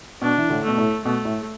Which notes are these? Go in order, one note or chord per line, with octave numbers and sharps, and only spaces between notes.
B2 D4
E3
A2 D3
B2 A3
A2
B2 A3
A2